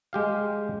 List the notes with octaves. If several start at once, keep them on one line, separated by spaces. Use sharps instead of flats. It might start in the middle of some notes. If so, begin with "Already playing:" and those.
G#3 G4 F5